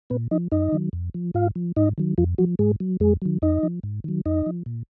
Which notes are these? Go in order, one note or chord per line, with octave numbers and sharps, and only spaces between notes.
A#2 B3 B4
F3 D#4 D#5
F#2 D#4 D#5
D#3 F#3
F2
F3
G#2 F4 F5
F3
G#2 D#4 D#5
D#3 F#3
F2 F3 F4
F3 F#3 F#4
G#2 G#3 G#4
F#3
F2 G#3 G#4
D#3 F#3
F2 D#4 D#5
F3
G#2
D#3 F#3
F2 D#4 D#5
F3
A#2